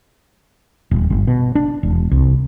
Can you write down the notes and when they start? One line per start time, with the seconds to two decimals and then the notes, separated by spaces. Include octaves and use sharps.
0.91 D#1
1.10 G1
1.27 B2
1.55 D4
1.83 E1
2.11 C2